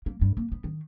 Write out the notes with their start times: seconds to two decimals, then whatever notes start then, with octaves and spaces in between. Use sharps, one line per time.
0.06 A#3
0.21 G2
0.37 A#3
0.52 B3
0.64 D#3